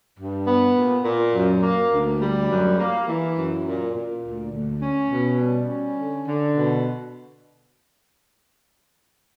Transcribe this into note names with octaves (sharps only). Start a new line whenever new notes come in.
G2
B3
A#2
A#2
F#2
A#3
D2
G3
F#2
A#3
E3
F#2
A#2
A#2
D2
D2
C#4
B2
G3
C#4
D3
D3
B2